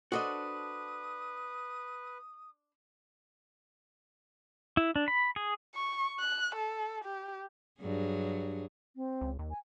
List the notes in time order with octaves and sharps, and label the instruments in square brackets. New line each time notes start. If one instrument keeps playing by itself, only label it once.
[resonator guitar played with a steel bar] D4 C5 [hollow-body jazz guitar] F#4 A4 D#5 [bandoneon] B4 [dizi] D#6
[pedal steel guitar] E4
D4
B5
G#4
[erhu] C#6
F#6
A4
G4
[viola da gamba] G2 F#3 G#4
[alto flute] C4
[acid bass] C#2
D#2
[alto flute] G#5